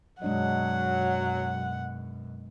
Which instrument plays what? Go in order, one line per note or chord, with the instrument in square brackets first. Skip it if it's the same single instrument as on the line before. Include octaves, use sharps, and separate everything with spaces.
[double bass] F#2 B2 [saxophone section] F#3 [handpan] G#3 D4 D#5 [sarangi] F#5